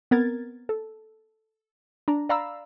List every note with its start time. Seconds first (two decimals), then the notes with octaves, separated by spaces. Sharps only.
0.11 B3 C4 A#4 G#6 A6
0.69 A4
2.08 D4 A#5
2.29 D5 F5 A#5 B5 E6